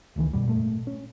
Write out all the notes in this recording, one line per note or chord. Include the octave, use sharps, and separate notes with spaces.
F1 C#2 D#3 E3
F#2 B2 G3
G#1 A#2 G#3 A3
C#4